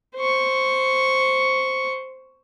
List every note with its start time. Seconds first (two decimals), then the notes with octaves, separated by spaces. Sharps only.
0.16 C5 C#6